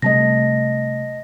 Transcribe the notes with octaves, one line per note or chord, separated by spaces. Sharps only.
C3 G3 A3 D#5 A5 A#6